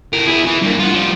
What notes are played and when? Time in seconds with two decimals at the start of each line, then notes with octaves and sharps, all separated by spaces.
0.13 A2 A#4
0.28 E4 G#4
0.46 E3
0.62 G2 A#3
0.79 F4 F#4
0.93 F3 G3